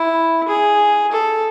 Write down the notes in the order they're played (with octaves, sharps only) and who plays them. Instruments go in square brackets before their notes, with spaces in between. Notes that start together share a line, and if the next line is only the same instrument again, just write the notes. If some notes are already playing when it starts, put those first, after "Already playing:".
Already playing: [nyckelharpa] E4
G#4
A4